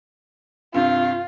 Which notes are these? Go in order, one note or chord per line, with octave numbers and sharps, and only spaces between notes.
G2 C3 F4